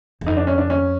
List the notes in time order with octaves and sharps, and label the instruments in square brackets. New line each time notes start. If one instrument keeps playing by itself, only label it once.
[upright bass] E2
[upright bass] F2 [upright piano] D#4
[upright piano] D4
C#4
D4
C#4